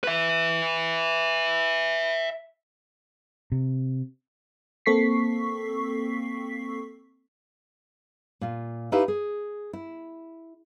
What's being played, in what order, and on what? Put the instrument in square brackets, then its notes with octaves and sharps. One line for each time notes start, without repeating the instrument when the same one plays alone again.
[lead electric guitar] B4 E5
[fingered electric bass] C3
[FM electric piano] A#3 C4 A4 C#6 B6 C7
[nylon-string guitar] A#2 F4
D#4 E4 G4 B4 E5 F5
G#4
E4